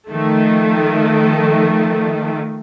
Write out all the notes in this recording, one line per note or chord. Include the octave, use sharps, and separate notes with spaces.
D#3 F3 A3